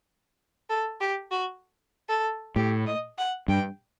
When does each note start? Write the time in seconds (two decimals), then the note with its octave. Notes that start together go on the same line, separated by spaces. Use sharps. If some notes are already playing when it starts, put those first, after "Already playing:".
0.70 A4
1.01 G4
1.31 F#4
2.09 A4
2.56 A2 G4
2.87 D#5
3.18 F#5
3.48 G2 G5